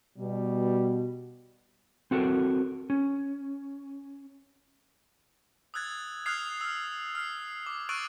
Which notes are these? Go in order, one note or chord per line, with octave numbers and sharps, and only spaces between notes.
B2 G3
C4 F#4 A4 A#4
C#4
D#6 E6 F#6 G#6 A6
D#6 F6 F#6 G#6 C7 F7
E6 F6
F6 C7
D6
C#6 D#6 E6 F#6 A6 D7